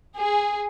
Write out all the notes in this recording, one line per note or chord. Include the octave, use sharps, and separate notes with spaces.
G#4